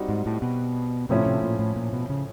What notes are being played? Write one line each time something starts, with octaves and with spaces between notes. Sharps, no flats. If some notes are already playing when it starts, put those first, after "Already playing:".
Already playing: G3 C4 D#4 F#4
G#2
A2
B2
A2 C3 F3 A3 C#4 E4
C3
A#2
A2
A#2
B2
C#3